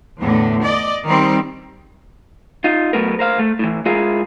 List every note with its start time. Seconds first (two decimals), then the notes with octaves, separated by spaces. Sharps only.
0.19 E2 A2 D3
0.63 D5 D#5
1.06 D#3 G3 C4
2.64 D#4 F4
2.93 F#3 A3 B3 A#4
3.19 A#4 C5 F5
3.39 A3
3.59 A2 E3
3.86 G#3 E4 F4 G#4 A#4 F5